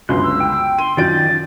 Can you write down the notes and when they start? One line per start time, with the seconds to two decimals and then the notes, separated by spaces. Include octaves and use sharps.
0.09 G1 C#2 F#2 C6 F#6
0.24 E6
0.40 G5
0.79 C6 D#7
0.97 F#2 D#3 F4 D5 G6 A6 D7